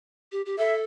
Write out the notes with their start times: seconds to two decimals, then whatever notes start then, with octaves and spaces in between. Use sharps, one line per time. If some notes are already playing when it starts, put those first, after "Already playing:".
0.32 G4
0.46 G4
0.58 A4 E5